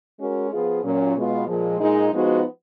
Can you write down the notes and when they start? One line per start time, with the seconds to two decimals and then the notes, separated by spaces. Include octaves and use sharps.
0.19 G#3 C#4 F#4 A#4
0.51 F3 B3 F4 G#4
0.83 A#2 F#3 C#4
1.15 B2 G#3 B3 F4
1.48 A#2 F3 G#3
1.80 A#2 G#3 D#4
2.12 F3 G#3 B3 D#4 F#4